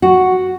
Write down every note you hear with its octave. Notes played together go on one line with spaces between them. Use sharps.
F#4